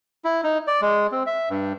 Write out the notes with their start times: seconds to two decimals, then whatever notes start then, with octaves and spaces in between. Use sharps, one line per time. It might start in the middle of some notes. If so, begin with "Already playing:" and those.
0.25 E4
0.44 D#4
0.67 D5
0.82 G#3
1.12 C4
1.27 E5
1.50 G2